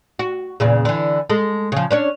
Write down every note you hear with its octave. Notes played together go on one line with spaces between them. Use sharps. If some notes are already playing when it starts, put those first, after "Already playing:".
F#4
E2 A#2 C#3
D3 E3
G#3 A4
C#3 F3
C#4 D4 C#5